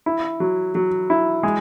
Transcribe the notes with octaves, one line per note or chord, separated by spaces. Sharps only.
E4
F#3
F#3
E4
G#3